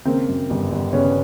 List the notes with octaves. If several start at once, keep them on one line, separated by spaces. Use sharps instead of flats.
C#3 A#3 C4
F#2
G1
G1
C#3 B3 C#4